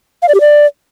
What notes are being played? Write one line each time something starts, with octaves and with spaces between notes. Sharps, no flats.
F5
D5
G4
D5